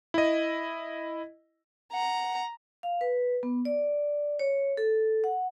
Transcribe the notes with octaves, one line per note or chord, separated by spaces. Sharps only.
E4 D#5
F#5 A#5
F5
B4
B3
D5
C#5
A4
F#5